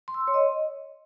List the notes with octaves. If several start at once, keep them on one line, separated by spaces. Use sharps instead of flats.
C6
E6
C6
C#5
D#5